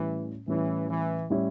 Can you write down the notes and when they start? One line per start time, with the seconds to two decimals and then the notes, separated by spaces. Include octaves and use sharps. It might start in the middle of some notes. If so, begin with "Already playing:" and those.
Already playing: A2 E3 G3 C#4 E4
0.48 A2 E3 G3 C#4 E4
0.89 E3
1.30 A2 G3 C#4 E4